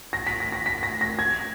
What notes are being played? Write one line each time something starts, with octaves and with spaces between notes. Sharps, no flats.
A#6
B6
A#6
A#6
B6
A#6
A#6
G#6